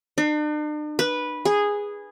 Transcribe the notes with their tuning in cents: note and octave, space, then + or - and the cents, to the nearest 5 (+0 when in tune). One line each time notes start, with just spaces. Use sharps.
D4 +45
B4 -10
G#4 -10